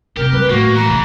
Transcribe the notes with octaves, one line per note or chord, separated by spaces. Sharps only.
F#2 C3 G4 A#4
F#3 B4
A2 F3 A#3 F#4
E3 F#4 A#5
C#3 E3 B3